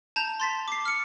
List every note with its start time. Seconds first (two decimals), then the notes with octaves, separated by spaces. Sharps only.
0.16 A5 A#5 G6
0.40 C6 A6 B6
0.68 D6 C7
0.85 F6 C#7